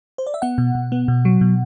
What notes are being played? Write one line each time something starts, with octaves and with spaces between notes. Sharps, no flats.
C5
D5
E5
B3 F#5
B2
B2
B3
B2
F#3
B2